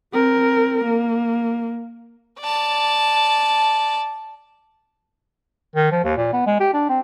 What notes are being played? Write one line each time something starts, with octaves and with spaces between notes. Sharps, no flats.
C4 A#4
A#3
D5 A5
D#3
F3
D#2
A#2
B3
G#3
G4
D4
C4